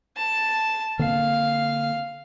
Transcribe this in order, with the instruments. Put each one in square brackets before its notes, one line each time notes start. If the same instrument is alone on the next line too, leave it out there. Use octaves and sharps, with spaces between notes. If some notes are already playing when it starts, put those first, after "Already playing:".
[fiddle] A5
[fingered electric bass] D3 A#3 C4 [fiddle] F5